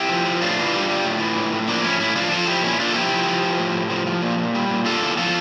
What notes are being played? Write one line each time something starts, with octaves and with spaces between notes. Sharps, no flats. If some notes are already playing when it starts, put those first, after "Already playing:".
Already playing: E4 G4
F3
F3
A2 D4 F4
E3
G3
G3
A2
E3
A2
A2
F3 A#3 D4
A2 C#4 E4
A2 C#4 E4
F3 D4 F4
F3 F4 A4
F3 E4 G4
A#2 C#4 E4
A#2 D4 F4
A4
F3 E4 G4
F3
F3
F3
A2
A2
F3
F3
A#2
A#2
G3
A#2
D3 F4 A4
E2
F3 F4 A4